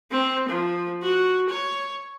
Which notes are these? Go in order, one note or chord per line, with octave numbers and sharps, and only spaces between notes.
C4
F3
F#4
C#5